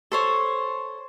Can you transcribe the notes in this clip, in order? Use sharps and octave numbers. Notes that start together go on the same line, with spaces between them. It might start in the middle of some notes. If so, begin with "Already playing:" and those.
A4 C5 C#5